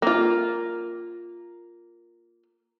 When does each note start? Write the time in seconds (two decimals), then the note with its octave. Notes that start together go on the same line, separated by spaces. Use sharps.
0.02 A#3 F4